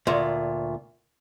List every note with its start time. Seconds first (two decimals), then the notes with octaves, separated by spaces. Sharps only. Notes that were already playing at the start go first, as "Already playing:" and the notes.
0.07 D2 A#2